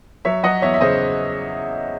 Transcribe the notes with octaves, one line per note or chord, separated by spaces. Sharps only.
F#3 C#5 E5
F#3 D#5 F#5
E2 C#5 E5
E5
C#3 C5 D#5